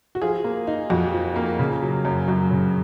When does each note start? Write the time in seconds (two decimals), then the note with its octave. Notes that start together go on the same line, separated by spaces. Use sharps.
0.15 F#4
0.21 F3 F4 G#4
0.44 A#3
0.67 D#4
0.90 F2 F#4
1.13 F3
1.36 A#3
1.59 C#3
1.82 F#3
2.05 F#2
2.28 F#2 F#4
2.51 C#3